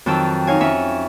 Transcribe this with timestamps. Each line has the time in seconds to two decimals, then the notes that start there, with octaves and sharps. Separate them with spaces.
0.06 F2 D#3 F#3 G5 A5 E6
0.47 D#4 C#5 F5 G#5
0.60 F2 C#4 E5 C#6